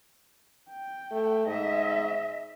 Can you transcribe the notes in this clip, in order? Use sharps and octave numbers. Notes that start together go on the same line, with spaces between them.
G5
A3
G#2 D#5 E5